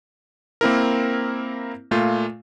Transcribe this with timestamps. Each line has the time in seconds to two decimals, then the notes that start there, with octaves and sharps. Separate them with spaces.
0.61 A#3 C4 E4 A#4
1.91 A#2 A3 F4